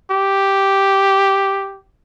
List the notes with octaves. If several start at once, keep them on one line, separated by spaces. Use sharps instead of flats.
G4